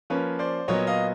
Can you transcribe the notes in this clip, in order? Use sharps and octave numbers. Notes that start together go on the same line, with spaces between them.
F3 A#3 C#4 B4 C#5
C5 D5
A#2 F#3 B3 C#5 D#5
D#5 F5